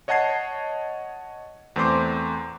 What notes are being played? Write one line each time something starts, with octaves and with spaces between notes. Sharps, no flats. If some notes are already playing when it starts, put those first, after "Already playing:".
C#5 D#5 F#5 A5 G#6 C7
E2 A3 C4 C5 C6 D6